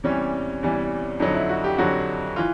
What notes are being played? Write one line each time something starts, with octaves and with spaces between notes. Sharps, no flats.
E2 C3 E3 G3 C#4
E2 C3 E3 G3
F2 D3 F#3 D#4
E4
F#4
G4
F2 D3 F#3 F#4
E3 F4